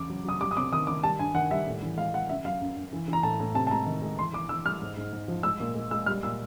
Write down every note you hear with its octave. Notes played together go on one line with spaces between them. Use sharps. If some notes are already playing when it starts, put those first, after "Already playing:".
Already playing: E2 C#3 D6
F#3
F#3 D#6
G3 D6
D#6
C3 D6
D#3 D#6
D#3 D6
G3 A5
G2 G#5
D#3 F#5
G3 E5
A2
E3
G#3 F5
G#3 F#5
F#2 E5
F#3 F5
F#2
F#2
E3
E3
A#5
A2 A5
A2
C3 A5
A5
G#3 A#5
D#3
G#3
E3 C6
E3 D6
E3 E6
G3 F6
G#2
G#2
G#2
F3
G#3 E6
A#2
G#3
G#3 E6
G3 F6
A#2 E6